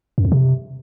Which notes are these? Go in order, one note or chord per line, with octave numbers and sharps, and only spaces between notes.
F#2
F2
C3